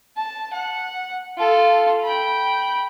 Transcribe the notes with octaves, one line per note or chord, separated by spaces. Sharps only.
A5
F#5
F4 A4
G5 B5